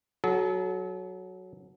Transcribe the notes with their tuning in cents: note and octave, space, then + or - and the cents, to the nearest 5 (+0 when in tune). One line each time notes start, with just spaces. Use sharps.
F#3 +0 A4 -40